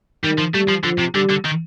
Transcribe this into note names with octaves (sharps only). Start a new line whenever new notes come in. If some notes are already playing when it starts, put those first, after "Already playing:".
D#3 G3
F3
G3 A3
F3
D3 F3
C3
D3 G3
D3
D#3